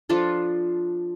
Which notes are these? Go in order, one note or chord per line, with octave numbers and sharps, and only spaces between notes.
F3 D4 F4 A4